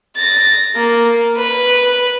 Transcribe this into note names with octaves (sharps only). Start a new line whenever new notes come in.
A6 A#6
A#3
B4